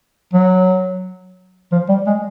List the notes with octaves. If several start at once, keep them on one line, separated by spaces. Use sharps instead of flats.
F#3
F3
G3
G#3